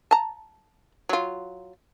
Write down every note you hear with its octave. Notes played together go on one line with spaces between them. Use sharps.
A5 A#5
F#3 F4